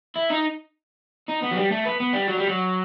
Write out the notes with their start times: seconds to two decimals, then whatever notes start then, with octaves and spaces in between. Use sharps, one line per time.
0.16 E4
0.30 D#4
1.29 D#4
1.43 B3
1.52 F#3
1.57 G3
1.72 A3
1.85 B3
2.00 B3
2.13 G3
2.28 F#3
2.37 G3
2.48 F#3